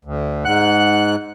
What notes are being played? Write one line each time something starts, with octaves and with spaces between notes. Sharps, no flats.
D2
G#2 F#5 F#6